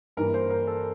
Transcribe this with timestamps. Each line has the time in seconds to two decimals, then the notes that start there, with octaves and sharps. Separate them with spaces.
0.17 G2 E3 A#3 A#4
0.34 C5
0.50 A#4
0.67 A4